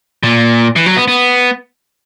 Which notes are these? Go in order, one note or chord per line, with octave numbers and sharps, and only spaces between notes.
A#2
E3
F#3
B3
B3